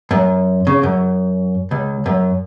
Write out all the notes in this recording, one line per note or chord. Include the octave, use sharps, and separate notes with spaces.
F#2
C#3
F#2
C#2
F#2